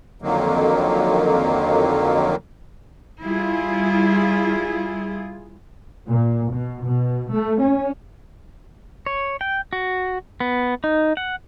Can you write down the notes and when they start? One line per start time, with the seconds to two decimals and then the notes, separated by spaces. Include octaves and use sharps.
0.22 F2 D3 D#3 F#3 A#3
3.22 G3 E4 F4 G#4
6.07 A#2
6.52 B2
6.84 B2
7.31 A3
7.61 C#4
9.06 C#5
9.41 G5
9.73 F#4
10.40 B3
10.84 D#4
11.17 F#5